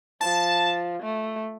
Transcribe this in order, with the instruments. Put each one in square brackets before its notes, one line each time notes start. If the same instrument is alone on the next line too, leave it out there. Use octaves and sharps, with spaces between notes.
[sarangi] F3 [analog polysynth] A5
[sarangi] A3